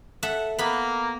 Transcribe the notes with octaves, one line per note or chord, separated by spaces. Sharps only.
A4 E5 F#5
A#3 B3 B5